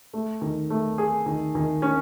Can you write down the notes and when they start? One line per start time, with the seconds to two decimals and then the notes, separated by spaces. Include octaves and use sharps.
0.13 A3
0.42 D#3
0.70 A3
0.98 G#4
1.26 D#3
1.55 D#3
1.82 C#4